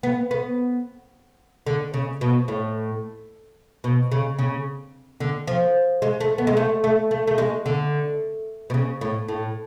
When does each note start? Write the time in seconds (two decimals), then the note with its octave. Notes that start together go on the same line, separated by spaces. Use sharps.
0.03 B3
0.31 B3
1.66 D3
1.94 C#3
2.21 B2
2.48 A2
3.84 B2
4.12 C#3
4.39 C#3
5.20 D3
5.47 F3
6.02 G#3
6.20 A3
6.38 B3
6.47 G#3
6.57 A3
6.84 A3
7.11 A3
7.27 A3
7.38 G#3
7.66 D3
8.70 B2
8.74 C#3
9.01 A2
9.28 A2